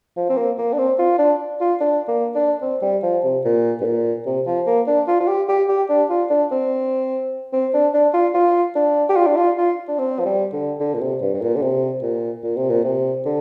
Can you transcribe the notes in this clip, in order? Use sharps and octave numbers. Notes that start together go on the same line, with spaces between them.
F3
C4
A#3
A#3
D4
C4
F4
D4
F4
D4
A#3
D4
C4
G3
F3
C3
A#2
G2
A#2
C3
F3
A#3
D4
F4
F4
G4
G4
G4
D4
F4
D4
C4
C4
D4
D4
F4
F4
D4
G4
F4
D4
F4
F4
D4
C4
F3
G3
D3
D3
A#2
C3
G2
G2
A#2
D3
C3
A#2
A#2
C3
A#2
C3
D3